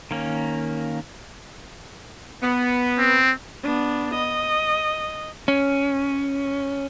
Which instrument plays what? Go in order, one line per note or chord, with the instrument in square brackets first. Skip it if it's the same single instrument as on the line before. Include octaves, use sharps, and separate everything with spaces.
[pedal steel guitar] D#3 A#3 C#4
[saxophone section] B3
[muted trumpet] C4
[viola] B3 D4
D#5
[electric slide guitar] C#4